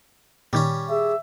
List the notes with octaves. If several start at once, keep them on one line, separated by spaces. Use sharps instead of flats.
A#2 D#3 G3 C#4
G#4 E5